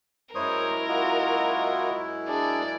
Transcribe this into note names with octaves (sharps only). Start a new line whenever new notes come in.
F#2 G#3 E4 A#4 C5 C#5 D#6
F4 F#4 D#5
D4 G#4 D5